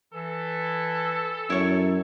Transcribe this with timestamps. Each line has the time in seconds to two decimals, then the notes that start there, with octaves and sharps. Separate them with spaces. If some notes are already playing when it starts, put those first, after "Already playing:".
0.14 E3 A4
1.50 F#2 E4 C#5